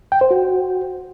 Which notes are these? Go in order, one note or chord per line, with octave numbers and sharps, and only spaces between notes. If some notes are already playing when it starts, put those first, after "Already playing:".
G5
C5
F#4